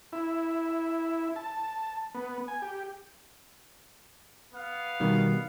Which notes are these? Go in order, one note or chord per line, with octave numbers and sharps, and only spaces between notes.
E4
A5
B3
G#5
G4
B3 F5
B2 D#3 G3